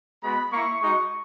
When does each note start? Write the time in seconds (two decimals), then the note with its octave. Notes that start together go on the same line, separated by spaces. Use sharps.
0.23 G#3 B3 F#4 B5
0.52 A#3 E4 C#6
0.80 G#3 D#4 F#4 C#6